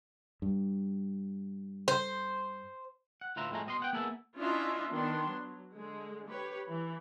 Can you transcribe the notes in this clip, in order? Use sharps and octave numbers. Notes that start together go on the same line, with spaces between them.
G2
C5
F#5
D2 A2 F4 B4 E5 A#5
F2 A2 G#3 A3 A#5
B2 D#5 F5 C6
B3 F#5 G5
A#3 B3 E4 G#4 A4 E5
C#4 D4 E4 F4 D#5 E5
D#3 B3 D4 C6
F#3
D3 G#3
G4 B4 C#5
E3